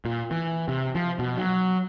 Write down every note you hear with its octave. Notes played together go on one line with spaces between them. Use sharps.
A#2
E3
C3
F3
B2
F#3